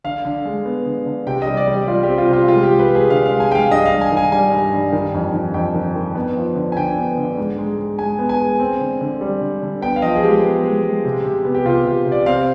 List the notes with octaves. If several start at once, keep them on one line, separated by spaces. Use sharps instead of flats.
D3 F5
D3
G#3
B3
D3
D3
C3 G5
G3 D#5
D5
G3 G4
G3 F4
C4 G4
F4
C3 F4
G#3 F4
G4
G#3
B4
G#3
G#4
D3 F5
G#3 F5
G#5
G#3 F5 G5
G2 D#5
F5
G2
G#5
D#3
G#5
G3 G#5
G2
G2
D#3
F2
D#3
F2 G5
D#3
D#3
B3
F3
D3
G#5
D3 G5
B3
D3
G#2
G#3
G#3
G#3 G#5
B3
G#5
G#3
C4
D3
D3
G3
D3
D3
B3 G5
F5
F3 D#5
G#4
G#3 G4
B3
G#3
G#3
C3
C3
B3
G4
C3 F4
C3
C3
D5
C4 F5